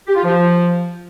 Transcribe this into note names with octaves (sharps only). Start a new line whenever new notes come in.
G4
F4
F3